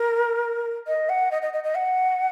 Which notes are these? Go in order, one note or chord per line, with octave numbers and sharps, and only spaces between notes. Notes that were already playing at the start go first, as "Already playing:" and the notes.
Already playing: A#4
D#5
F#5
D#5
D#5
D#5
D#5
F#5